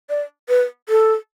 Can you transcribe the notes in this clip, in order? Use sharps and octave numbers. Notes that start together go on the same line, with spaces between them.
D5
B4
A4